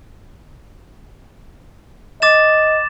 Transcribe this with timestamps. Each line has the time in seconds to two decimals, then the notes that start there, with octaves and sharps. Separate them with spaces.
2.22 D#5 D6 A6 E7